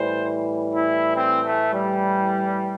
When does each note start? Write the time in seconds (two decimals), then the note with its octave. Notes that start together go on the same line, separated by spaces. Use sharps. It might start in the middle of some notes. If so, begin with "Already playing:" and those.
Already playing: A2 E3 G3 C5
0.75 E4
1.17 C4
1.46 A3
1.74 G3